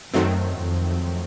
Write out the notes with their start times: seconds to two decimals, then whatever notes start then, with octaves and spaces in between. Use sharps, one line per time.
0.14 F#2 D#3 F#3 A3 C4
0.61 F2